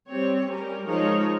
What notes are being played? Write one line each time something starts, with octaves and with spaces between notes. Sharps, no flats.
G3 C4 G4 C#5
G3 C#4 G4 A#4
F3 G#3 D#4 A#4 C#5